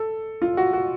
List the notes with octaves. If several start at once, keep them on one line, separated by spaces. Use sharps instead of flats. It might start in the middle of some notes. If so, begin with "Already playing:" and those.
Already playing: A4
F4
F#4
F#4